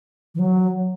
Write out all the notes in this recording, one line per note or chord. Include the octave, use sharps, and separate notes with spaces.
E3
F#3